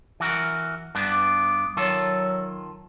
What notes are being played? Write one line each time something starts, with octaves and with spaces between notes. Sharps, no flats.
E3 F#4 A#4
G2 B3 D4
D6
D#3 F#3 F4 A4